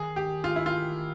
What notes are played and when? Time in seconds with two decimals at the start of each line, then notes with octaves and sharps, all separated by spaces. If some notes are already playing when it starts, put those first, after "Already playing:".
Already playing: D#3 G#4
0.16 G4
0.44 F4
0.56 E4
0.66 F4